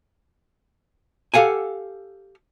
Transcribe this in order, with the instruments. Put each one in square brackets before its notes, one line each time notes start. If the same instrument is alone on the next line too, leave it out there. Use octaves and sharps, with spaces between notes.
[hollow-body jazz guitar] G4 A4 F5 F#5 G#5